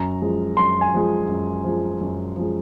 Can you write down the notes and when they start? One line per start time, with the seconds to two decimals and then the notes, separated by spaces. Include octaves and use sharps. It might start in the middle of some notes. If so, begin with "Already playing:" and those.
Already playing: F#2 A#5
0.22 F3 G#3
0.57 F#2 C6
0.81 G#5
0.94 F3 G#3
1.28 F#2
1.64 F3 G#3
2.01 F#2
2.36 F3 G#3